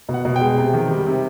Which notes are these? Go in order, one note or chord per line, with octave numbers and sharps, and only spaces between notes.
B2
F#5
B2
G5
G#3
C3
D#3
G3
C3